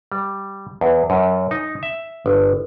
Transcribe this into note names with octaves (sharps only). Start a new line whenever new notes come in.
G3
E2
F#2
D#4
E5
G1